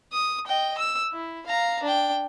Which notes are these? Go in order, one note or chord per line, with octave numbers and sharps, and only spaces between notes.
D#6
D#5 G5
E6
E4
F5 A#5
D4 G5